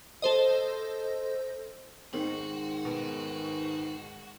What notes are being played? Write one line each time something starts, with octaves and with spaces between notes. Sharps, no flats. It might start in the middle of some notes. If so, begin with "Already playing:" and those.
A4 C5 D#5
G#2 D#3 C4 F#4
B2